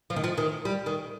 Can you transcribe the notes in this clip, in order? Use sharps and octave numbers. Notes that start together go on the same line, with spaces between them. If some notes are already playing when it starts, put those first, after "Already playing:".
F3
D#3
F3
D#3
G3
D#3